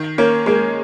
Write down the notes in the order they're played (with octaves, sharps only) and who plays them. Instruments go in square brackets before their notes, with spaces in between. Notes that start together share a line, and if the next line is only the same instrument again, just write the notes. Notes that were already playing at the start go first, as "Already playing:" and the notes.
Already playing: [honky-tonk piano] D#3
[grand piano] A#3 [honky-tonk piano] C#4
[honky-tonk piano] G#3 [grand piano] A#3